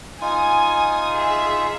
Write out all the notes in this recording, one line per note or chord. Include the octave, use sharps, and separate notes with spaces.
D#4 F4 G#5 D#6
G#4 E5